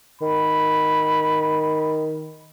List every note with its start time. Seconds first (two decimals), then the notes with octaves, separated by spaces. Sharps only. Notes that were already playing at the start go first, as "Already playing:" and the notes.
0.21 D#3 B5